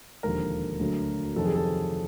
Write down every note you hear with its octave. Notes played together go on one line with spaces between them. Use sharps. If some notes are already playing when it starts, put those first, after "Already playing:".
E1 D#2 D3 F3 A#4
D2 D3 F#3
F2 C3 D#3 F#3 A4
G#4
A4